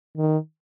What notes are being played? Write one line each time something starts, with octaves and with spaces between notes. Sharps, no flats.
D#3